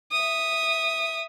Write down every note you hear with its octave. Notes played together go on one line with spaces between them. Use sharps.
E5 D#6